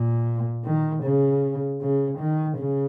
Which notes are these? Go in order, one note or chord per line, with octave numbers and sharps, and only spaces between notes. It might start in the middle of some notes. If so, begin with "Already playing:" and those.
Already playing: A#2
D#3
C#3
C#3
D#3
C#3